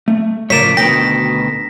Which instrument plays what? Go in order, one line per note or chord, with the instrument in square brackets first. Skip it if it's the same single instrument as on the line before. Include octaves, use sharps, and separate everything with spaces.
[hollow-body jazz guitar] A3
[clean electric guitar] A2 F3 D5 [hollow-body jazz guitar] C#3 A#4 C#5 [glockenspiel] B6 E7
[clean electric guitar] D2 B2 D#3 [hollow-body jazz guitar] G5 [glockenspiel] A#6